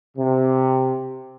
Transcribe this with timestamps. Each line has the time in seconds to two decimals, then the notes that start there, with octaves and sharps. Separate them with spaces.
0.17 C3